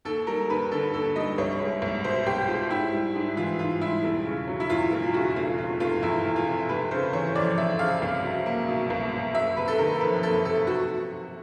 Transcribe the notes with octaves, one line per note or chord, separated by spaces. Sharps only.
D#2 A4
G3 A#4
D#2 B4
D3 A4
D#2 A4
G3 D#5
C2 C#5
G#3
C2
B2 C5
C2 G4
G#3 F4
G#2 E4
G3
G#2
E3 F4
G#2 F4
G3 E4
E1
C#3
F#3
E4
E2 F4
E1 F4
C#3 F#4
F1 F4
C3 F4
F1 F4
E2 E4
F1
F4
C3
F1 B4
C#3 C5
E3 C#5
F2 D5
F1 E5
C#3 F5
C2
F#3
A#3
B2
C2
F#3
F#1 E5
C3 B4
A4
D#3 A#4
F2 B4
F#1 A4
C3 A4
F#4